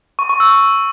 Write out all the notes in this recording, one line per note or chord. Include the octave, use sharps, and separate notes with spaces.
C#6
C#6
E6